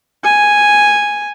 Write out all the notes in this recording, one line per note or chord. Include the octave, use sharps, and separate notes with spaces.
G#5